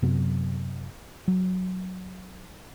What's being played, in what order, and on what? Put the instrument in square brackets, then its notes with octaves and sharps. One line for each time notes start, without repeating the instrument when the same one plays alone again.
[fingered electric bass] F#2 C3 F#3 B3
F#3